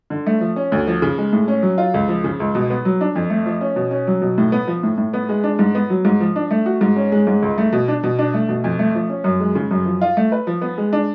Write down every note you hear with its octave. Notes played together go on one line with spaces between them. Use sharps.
D3
A3
F3
C#4
D2
F3
C#3
G#3
A2
C#4
F#3
F4
C#2
F3
C#3
C#2
B2
B3
F#3
D4
F2
A3
F3
C#4
B2
C#4
F#3
B2
A2
B3
F3
A2
A2
B3
G#3
D4
G#2
B3
F#3
G#2
F3
D4
A3
F#4
G#2
C#4
G#3
G#2
C#2
A3
B2
D4
B2
D4
A3
B2
F2
A3
F3
C#4
F#2
G#3
C#3
F#2
F3
F4
A3
B4
F3
B3
G#3
D4